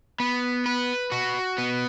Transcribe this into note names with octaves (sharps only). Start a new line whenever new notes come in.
B3
B4
F#4
B3